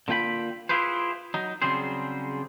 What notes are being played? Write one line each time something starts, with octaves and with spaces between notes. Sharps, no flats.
D3 A#3 F4 G5 B5
E4 F4 G4 G#4 B4 C5
F#3 D#4
C#3 F#3 G3 C4 G#4 C5